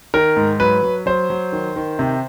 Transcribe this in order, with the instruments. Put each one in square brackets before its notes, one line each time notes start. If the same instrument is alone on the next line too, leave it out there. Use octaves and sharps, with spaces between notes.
[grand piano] D#3 A#4
G#2
F#3 B4
F#3
F#3 C5
F#3
D#3
D#3
C3